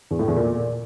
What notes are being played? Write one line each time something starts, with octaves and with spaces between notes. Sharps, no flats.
E2
A2
E2
A#2